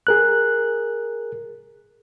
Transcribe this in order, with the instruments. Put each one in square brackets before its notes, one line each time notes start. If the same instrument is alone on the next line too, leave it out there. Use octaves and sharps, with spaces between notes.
[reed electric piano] G#4 A#4 F#6